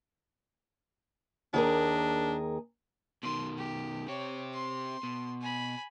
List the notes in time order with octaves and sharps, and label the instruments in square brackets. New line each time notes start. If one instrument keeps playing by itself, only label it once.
[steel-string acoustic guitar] D#2 G#4 A#4 [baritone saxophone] D4
[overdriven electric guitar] B2 D#3 [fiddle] C6
[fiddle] G4
[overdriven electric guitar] C4 G4 [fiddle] C#5
[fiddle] C6
[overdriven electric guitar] B2
[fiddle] G#5 B5